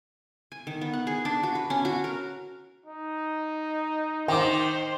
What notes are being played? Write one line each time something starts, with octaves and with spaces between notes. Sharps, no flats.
G#5
D#3
B3
F#5
G#4
D4
F#4
B4
C#4
F#4
A#4
D#4
D#3 C5 G5 D6